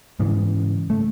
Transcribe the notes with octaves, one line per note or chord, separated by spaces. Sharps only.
G#2 C#3 E3
A3